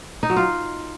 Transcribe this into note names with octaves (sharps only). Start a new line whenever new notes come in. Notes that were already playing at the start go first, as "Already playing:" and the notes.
D#4
F#3
F4